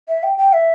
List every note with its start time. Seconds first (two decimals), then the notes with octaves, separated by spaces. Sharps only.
0.08 E5
0.23 G5
0.38 G5
0.53 E5